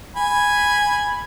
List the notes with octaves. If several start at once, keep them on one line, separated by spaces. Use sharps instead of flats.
G#5 B5